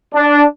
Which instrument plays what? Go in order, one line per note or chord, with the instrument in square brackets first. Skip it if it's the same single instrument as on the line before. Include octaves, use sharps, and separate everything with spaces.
[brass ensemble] D4